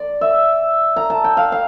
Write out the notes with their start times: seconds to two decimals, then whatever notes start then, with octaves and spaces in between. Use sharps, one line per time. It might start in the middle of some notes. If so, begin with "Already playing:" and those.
Already playing: D5
0.21 E5
0.96 A#5
1.10 A5
1.24 G5
1.37 F5
1.52 F5